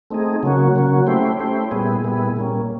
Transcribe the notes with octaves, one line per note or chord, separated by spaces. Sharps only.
A3 C4 D#4 G#4
C#3 F#3 A#3 C#4 F#4
C#3 F#3 A#3 C#4 F#4
A3 C#4 E4 G4 C5
A3 C#4 E4 G4 C5
A#2 G3 B3 E4 G#4
A#2 G3 B3 E4 G#4
A#2 G3 A#3 C#4